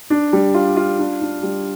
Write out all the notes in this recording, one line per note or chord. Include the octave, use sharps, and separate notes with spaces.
D4
G3
F4
F4
D4
D4
G3